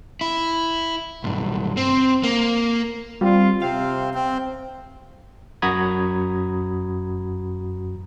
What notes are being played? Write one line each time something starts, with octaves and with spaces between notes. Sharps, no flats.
E4
B1 G2
C4
A#3
G3 C4 F4
C3 C4 F5
C4
F#2 F#4 A#5 B5 D#6 G#6